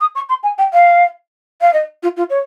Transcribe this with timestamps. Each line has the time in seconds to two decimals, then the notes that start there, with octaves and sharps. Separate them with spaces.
0.01 D#6
0.15 C#6
0.29 C6
0.43 G#5
0.58 G5
0.73 F5
1.61 F5
1.73 D#5
2.03 F4
2.17 F4
2.30 C#5